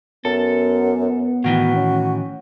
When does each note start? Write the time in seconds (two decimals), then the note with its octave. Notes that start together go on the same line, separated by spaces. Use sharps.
0.25 F#2 B3 A4
1.44 A2 D#3 E3 F#4
1.76 C#4